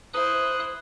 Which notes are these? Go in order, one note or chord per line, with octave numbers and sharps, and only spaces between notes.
E4 C5 D#6 F#6